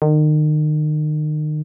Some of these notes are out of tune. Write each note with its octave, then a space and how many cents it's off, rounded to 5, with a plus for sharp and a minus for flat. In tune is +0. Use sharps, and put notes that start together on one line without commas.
D#3 -35